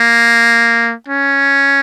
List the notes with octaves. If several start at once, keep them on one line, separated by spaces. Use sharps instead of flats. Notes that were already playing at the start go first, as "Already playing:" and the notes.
Already playing: A#3
C#4